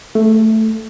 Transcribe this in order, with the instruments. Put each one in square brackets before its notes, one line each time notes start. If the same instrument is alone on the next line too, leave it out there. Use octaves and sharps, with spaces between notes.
[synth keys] A3